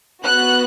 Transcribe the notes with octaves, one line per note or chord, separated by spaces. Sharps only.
B3 F#4 F#6